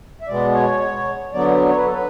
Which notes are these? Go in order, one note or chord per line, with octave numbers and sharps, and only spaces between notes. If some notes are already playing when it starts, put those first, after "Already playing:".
E5
B2 G#3 B3 D5
C#5
D3 F#3 B3 D5
C#5
B4
A4
B4